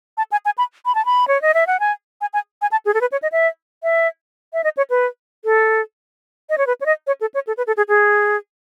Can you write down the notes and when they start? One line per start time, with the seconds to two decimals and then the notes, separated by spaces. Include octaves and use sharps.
0.17 A5
0.32 G#5
0.45 G#5
0.58 B5
0.86 B5
0.95 A5
1.05 B5
1.28 C#5
1.42 D#5
1.54 E5
1.67 F#5
1.80 G#5
2.21 G#5
2.34 G#5
2.62 G#5
2.72 A5
2.86 G#4
2.94 A4
3.01 B4
3.12 C#5
3.22 D#5
3.32 E5
3.83 E5
4.53 E5
4.64 D#5
4.77 C#5
4.90 B4
5.45 A4
6.50 D#5
6.58 C#5
6.67 B4
6.81 C#5
6.86 D#5
7.07 C#5
7.21 A4
7.34 C#5
7.47 A4
7.57 B4
7.67 A4
7.77 G#4
7.88 G#4